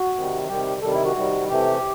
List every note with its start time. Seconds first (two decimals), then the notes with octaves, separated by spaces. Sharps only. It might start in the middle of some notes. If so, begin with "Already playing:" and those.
Already playing: F#4
0.15 C3 D#3 G3
0.48 C3 D#3 G3 G4
0.82 C3 D#3 G3 A4
0.93 E4
1.04 F#4
1.16 C3 D#3 G3
1.49 C3 E3 A3 G4